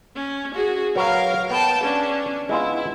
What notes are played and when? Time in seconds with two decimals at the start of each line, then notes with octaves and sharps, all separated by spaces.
0.15 C#4
0.54 F#4 G#4
0.96 F#3 A#4 B4 C#5 F5
1.50 B3 G5 A5
1.83 C#4 D4
2.49 G#3 B3 E4 F4